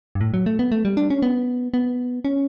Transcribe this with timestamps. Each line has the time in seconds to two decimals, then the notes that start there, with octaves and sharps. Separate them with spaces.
0.15 G2
0.21 A2
0.34 F#3
0.46 A3
0.59 B3
0.72 A3
0.85 G3
0.97 D4
1.10 C#4
1.22 B3
1.74 B3
2.25 C#4